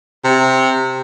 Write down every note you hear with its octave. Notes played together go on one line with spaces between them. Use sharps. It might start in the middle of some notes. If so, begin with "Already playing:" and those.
C3